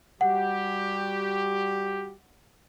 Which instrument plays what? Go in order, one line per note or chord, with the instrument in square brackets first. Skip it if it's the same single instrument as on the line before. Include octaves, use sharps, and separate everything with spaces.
[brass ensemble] G3 F#4 G4 [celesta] F#5